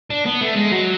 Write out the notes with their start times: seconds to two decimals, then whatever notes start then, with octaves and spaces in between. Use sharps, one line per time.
0.10 D4
0.26 B3
0.42 A3
0.56 G#3
0.72 F#3